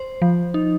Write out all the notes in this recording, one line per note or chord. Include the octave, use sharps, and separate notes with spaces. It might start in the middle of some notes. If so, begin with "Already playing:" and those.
Already playing: C5
F3
D#4